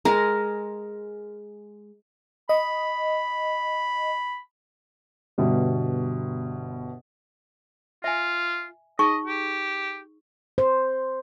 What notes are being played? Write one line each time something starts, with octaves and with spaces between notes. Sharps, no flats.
G#3 A#4
D#5 B5
G1 B2 G3
F4 E5 G#5
D#4 G#4 D#5 C#6
G4
C5